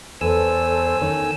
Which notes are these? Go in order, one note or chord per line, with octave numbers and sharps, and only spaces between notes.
E2 A4 C5 G#5 E6
D#3 C#4